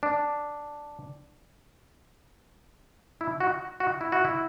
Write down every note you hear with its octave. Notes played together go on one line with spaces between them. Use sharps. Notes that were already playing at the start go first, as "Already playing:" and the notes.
D4
E4
F#4
F#4
E4
F#4
E4